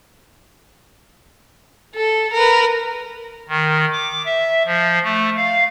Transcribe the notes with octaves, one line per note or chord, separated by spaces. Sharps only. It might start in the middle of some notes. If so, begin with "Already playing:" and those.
A4
A#4 B4
D#3
D6
E5
F3
A3
F5